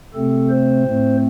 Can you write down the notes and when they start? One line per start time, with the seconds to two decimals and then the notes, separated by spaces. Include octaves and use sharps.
0.14 C3 A3 C4 A4
0.50 C5
0.85 A2 A3 C4